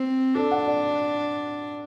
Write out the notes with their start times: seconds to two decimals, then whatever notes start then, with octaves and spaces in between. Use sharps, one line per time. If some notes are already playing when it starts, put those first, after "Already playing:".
Already playing: C4
0.35 D4 A4
0.51 F#5
0.67 D5